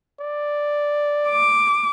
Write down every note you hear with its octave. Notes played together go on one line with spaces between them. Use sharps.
D5
D6